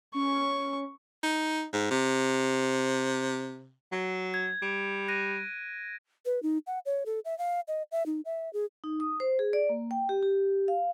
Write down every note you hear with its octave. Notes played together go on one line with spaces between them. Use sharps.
C#4 C#6
D#4
G#2
C3
F#3
G#6
G3 D7
F#6 A#6 D#7
B4
D#4
F#5
C#5
A4
E5
F5
D#5
E5
D#4
E5
G#4
D#4
D#6
C5
G#4
D5
A#3
G5
G4
G4
F5